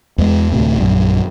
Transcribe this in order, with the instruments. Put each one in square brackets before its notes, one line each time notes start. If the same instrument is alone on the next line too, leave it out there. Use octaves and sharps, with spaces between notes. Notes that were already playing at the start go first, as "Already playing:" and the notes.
[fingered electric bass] E2 G#3
D2 A2 C3
A#1 F#2